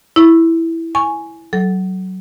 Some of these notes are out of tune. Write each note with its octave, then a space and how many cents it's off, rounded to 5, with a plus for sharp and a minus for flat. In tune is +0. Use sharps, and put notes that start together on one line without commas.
E4 +0 C#6 -20
G#5 +5 C#6 +0
F#3 +20 A4 -20